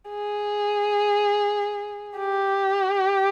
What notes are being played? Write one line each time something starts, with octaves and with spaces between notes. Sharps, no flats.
G#4
G4